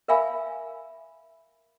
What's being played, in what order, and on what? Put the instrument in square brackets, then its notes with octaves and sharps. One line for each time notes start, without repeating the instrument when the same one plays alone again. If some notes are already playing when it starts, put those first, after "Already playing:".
[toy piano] A#4 E5 F5 G#5 B5